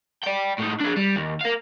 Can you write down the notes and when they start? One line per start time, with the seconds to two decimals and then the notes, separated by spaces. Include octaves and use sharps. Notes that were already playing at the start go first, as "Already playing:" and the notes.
0.23 D5 G5
0.58 A2 D#4
0.80 D4 G#4
0.96 G3
1.16 D#2
1.41 A#4 F5